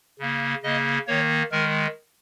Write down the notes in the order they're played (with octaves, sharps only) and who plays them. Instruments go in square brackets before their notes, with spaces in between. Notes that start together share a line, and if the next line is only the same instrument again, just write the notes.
[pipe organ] C#3 A#3
C#3 A#3 D#5
D#3 A#3 C#5
D#3 G#3 A#4